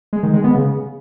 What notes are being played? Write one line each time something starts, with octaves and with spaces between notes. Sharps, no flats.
G#3
D#3
G#3
B3
C#3